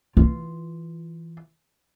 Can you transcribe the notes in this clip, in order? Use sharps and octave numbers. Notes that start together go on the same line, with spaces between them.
E3 F4